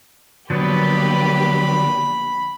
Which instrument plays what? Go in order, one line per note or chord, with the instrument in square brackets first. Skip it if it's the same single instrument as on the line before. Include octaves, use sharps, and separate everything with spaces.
[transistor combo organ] D3 [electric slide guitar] F3 F#3 B3 [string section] A#3 G4 B4 [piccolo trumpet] B5